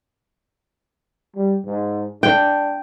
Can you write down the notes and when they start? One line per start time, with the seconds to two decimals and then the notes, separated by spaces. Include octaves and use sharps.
1.35 G3
1.65 G#2
2.23 D4 G5